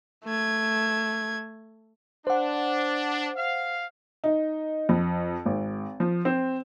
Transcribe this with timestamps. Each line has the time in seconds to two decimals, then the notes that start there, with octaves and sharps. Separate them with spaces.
0.25 A3 G#6
2.27 D4 C5 F#5
3.37 F5
4.24 D#4
4.89 F2
5.46 G#1
6.00 F3
6.25 C4